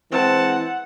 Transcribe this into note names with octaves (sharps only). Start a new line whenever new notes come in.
E3 G#3 C4 F#5 A5